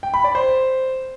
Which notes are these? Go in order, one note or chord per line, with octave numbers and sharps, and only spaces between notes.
G5
B5
D5
C5